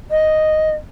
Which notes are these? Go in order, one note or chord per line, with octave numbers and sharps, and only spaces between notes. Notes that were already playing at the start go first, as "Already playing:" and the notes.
D#5